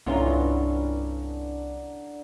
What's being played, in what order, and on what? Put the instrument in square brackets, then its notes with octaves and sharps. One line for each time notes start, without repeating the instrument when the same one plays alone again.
[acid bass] C2 [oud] G2 F4 [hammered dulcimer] D3 A#5 [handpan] B3 C#4 E4